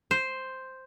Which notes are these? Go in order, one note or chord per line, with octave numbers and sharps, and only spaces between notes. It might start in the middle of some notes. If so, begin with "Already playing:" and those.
C5